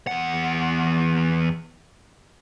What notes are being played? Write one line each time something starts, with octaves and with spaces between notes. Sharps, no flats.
E2 F#5